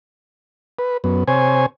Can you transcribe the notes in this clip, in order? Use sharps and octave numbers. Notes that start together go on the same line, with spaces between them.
B4
F#2 B3
C3 C5 C#5 G#5